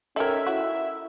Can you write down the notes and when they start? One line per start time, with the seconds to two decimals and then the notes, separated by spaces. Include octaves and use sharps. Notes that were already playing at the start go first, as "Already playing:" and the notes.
0.16 C#4 D#4 A4 A#4 E5 G5 G#6
0.47 E4 F#4